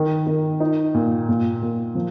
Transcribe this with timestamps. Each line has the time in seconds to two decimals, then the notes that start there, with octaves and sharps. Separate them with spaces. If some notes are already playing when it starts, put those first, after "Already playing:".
Already playing: D#3
0.27 D#3
0.60 D#4
0.94 A#2
1.29 A#2
1.62 A#2
1.95 F3